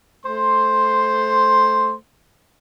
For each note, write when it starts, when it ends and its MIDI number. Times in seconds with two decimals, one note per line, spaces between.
0.25 1.93 57
0.25 1.93 72
0.25 1.93 84